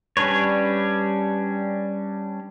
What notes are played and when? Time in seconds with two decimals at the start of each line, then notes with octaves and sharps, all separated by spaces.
0.17 G3 C#4 D4 B4 C#5